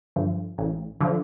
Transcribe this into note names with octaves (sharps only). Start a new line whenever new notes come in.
G2 D3 F3
A1
D3 F3